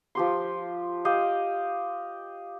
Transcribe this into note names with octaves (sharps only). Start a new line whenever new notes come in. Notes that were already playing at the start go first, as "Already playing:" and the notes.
F3 G4 C6
G4 D#5 F5